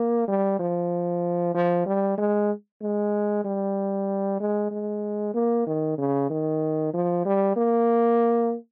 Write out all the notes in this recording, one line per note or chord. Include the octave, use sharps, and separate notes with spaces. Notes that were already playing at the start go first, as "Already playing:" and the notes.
Already playing: A#3
G3
F3
F3
G3
G#3
G#3
G3
G#3
G#3
A#3
D#3
C#3
D#3
F3
G3
A#3